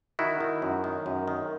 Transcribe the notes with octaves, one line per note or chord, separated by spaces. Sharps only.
D#3 E4 F#4
D#3
F#2
D#3
F#2
D#3